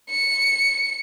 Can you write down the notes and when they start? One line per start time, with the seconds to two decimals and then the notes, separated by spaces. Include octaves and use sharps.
0.10 C#7